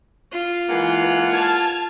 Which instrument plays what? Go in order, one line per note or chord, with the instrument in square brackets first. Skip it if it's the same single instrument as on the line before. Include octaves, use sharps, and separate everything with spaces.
[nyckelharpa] F4
[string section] E3 [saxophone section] G#3 A#3 F#5
[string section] A5 F6 G#6